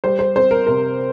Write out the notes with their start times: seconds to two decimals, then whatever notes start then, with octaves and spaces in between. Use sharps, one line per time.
0.04 G3 C5
0.19 C5
0.36 C4 C5
0.51 A#4
0.67 C3 A#4